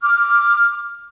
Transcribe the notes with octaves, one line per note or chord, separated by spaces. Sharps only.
D6 F6